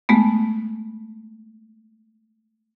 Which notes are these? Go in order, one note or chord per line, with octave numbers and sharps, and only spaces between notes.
G#3 A3 B3